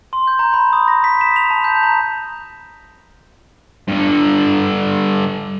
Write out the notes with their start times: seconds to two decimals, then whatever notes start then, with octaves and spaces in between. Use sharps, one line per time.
0.13 C6
0.27 G6
0.39 A#5
0.54 B5
0.73 D#6
0.88 A#6
1.04 B6
1.21 E7
1.36 F7
1.50 A5
1.64 G6
1.83 A#5
3.88 G2 D3